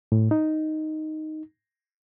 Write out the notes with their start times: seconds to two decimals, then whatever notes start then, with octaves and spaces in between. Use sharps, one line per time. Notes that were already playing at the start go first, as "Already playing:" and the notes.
0.12 A2
0.31 D#4